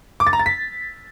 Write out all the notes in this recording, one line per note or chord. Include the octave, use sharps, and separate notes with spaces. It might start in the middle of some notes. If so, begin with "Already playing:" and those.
D6
A6
A#5
A6
B6